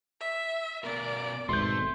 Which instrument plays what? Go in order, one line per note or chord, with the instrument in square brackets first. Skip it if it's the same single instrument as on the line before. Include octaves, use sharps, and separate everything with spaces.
[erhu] E5
[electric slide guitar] B2 B3 A#4 [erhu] D5
[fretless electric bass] G#1 G#2 B2 [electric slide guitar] A3 [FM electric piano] C6 G6